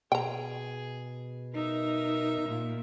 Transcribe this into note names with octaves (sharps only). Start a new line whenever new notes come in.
B2 G#4 G5 A#5
D#4 A#4 E5
A#2